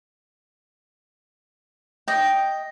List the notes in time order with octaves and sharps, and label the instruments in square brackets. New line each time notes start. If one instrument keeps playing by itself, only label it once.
[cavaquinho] D#5 G5